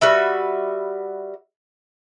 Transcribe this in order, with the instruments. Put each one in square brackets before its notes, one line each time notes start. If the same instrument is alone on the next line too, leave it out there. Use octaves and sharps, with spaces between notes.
[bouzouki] G3 F#4 B4 E5